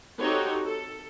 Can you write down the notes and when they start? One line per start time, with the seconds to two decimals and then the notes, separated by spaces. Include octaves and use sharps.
0.20 C4 D#4 F#4 G4 A4 C#5
0.65 A4